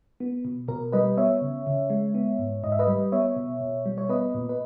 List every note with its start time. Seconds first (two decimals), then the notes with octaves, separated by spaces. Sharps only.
0.20 B3
0.45 B2
0.68 B2 A#4
0.92 G3 B4 D#5
1.17 B3 C#5 E5
1.42 C#3
1.67 C#3
1.90 G#3
2.14 B3
2.39 G#2
2.64 G#2 D#5
2.72 E5
2.79 B4 D#5
2.87 G3
3.12 B3 C#5 E5
3.36 B2
3.61 B2
3.86 G3
3.98 C#5
4.09 B3 B4 D#5
4.35 A#2
4.49 B4